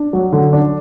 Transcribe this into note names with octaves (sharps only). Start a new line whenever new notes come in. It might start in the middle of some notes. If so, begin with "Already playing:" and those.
Already playing: D4
F#3
D3
D4